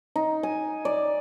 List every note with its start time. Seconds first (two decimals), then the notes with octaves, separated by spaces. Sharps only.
0.16 D#4
0.43 G#5
0.85 D5